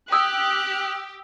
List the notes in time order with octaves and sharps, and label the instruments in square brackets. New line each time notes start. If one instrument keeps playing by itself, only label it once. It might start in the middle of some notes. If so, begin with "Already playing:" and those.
[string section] G4 [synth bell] D#6 E6 [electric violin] F#6